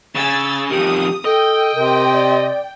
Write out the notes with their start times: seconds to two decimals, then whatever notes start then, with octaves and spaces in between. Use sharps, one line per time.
0.15 C#3 G#5 E6 A6
0.70 F2 D#3 G4 D#6
1.25 A4 D#5 G5
1.75 C3 A#4
2.13 D5